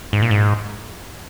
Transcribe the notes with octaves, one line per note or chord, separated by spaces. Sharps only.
G#2
A#2
G#2